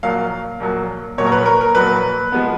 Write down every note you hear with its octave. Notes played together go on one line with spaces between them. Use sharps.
A#1 A#2 F#3 A#3 F5
A#1 A#2 F#3 A#3
A#1 A#2 F#3 A#3 C#5
A#4
B4
A#4
A#4
A#1 A#2 F#3 A#3 B4
F3 G#3 B3